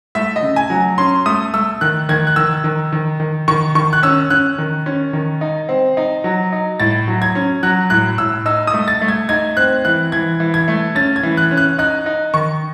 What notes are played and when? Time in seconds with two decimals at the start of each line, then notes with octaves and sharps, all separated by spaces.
0.15 A3 E5
0.36 D#5
0.42 C#3
0.56 G#5
0.70 F#3
0.98 C#4 C6
1.26 A3 D#6
1.54 A3 E6
1.81 D#3 F#6
2.09 D#3 G#6
2.27 F#6
2.36 D#3 E6
2.64 D#3
2.92 D#3
3.20 D#3
3.48 D#3 C#6
3.75 D#3 C#6
3.93 F#6
4.03 C#4 E6
4.30 C#4 F#6
4.58 D#3
4.86 C#4
5.13 D#3
5.41 D#4
5.69 C4
5.97 D#4
6.24 F#3
6.52 D#4
6.80 A2 A6
7.08 F#3
7.22 G#6
7.35 C#4
7.63 F#3 F#6
7.90 A2 F#6
8.18 A2 E6
8.45 D#4 E6
8.67 D#6
8.73 A3
8.88 A6
9.01 A3
9.08 G#6
9.29 D#4 G#6
9.57 C4 F#6
9.85 E3 F#6
10.12 E3 G#6
10.40 E3
10.54 G#6
10.68 A3
10.95 C#4 A6
11.16 G#6
11.23 E3
11.37 F#6
11.51 C#4
11.57 F#6
11.78 D#4 F#6
12.06 D#4
12.34 D#3 C#6